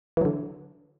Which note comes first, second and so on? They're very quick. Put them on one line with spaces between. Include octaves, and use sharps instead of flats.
E3 F#3 D3